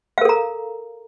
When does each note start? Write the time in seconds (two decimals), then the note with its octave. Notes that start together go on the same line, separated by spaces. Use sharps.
0.18 F5
0.21 A#4
0.25 A4
0.29 A#5